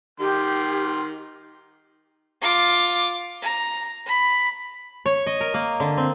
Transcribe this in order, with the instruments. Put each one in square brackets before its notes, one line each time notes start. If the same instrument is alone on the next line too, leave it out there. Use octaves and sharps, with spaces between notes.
[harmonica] D#3 C6 [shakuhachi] G4
[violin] F4 D6
A#5
B5
[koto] C#5
D#5
A#4
A#3
D3
C4